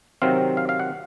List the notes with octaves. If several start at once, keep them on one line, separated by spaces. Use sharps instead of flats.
C3 D#3 F#3 C4 F5
F5
F5
F#5